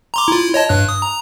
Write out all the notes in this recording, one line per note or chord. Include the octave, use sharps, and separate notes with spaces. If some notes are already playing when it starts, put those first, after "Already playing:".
A#5 C6 D6
E4 F4
C#5 D#5 A5
G2 F#6
D#6
A#5